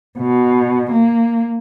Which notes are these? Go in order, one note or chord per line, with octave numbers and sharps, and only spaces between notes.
B2
A#3